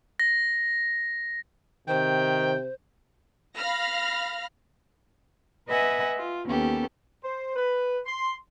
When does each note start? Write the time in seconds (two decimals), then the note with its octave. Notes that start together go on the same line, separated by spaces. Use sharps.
0.20 A#6
1.88 C3 D#3 C5 G5
3.55 F5 B5 F6 A#6
5.67 B4 D#5 E5 F#5 G#5
6.16 F4
6.46 D#2 B3 C#4 G4 A4
7.24 C5
7.56 B4
8.06 C6